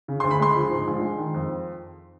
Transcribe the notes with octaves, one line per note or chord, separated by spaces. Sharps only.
C#3
D2 C6
B5
G#3 C6
F3
G#2
A#1
G#3
D#3
F2